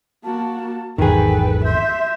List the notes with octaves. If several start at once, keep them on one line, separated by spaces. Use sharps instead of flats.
A#3 F#4 A5
G#1 E2 G#2 D#3 G#4 A4 B4 G5
E5 C6 G6